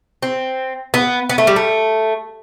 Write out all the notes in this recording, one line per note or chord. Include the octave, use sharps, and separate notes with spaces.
C4
B3
B3
A3
G3
A3